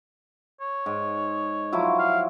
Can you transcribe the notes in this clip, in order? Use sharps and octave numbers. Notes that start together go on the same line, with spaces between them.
C#5
G#2
F3 F#3 E4
F5